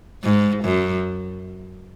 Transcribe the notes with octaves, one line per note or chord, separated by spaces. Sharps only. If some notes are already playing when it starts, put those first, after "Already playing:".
G#2
F#2